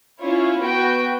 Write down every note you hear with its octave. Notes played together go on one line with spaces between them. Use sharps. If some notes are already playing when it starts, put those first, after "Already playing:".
C#4 E4 F4 C#5
B3 F#4 B4 G5 D7